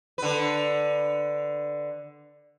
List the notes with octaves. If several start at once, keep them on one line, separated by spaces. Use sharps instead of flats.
D3 B4